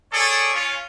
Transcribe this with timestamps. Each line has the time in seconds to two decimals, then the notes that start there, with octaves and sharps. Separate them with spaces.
0.12 G#4 A4 C#5 D5
0.54 C#4 F4